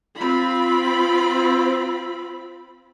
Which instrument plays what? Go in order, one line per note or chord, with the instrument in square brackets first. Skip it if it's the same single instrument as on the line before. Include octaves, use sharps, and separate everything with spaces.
[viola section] C4 F4 B5